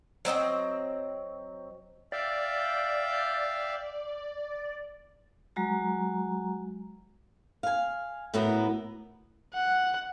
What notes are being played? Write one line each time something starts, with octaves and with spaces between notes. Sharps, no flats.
F#3 C4 D#5 G5
D5 E5 F5 G5
F#3 G#3 F#4 A#5
F5 G#5
A2 A3 B3 F#4 A#4
F#5